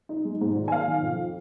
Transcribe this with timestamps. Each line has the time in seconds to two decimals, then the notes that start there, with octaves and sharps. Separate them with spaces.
0.09 D#4
0.25 G#3
0.41 G#2
0.55 G#1
0.68 G#5
0.71 A#3 F5
0.88 D#3
1.02 F2